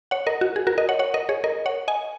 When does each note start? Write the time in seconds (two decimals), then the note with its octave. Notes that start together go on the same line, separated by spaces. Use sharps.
0.11 C#5 F#5
0.27 A#4 D#5
0.41 F#4
0.56 G#4
0.67 F#4 A#4
0.78 A#4 D#5
0.89 C#5 F#5
0.99 C#5 F#5
1.14 A#4 D#5
1.29 G#4 C#5
1.44 A#4 D#5
1.66 C#5 F#5
1.88 D#5 G#5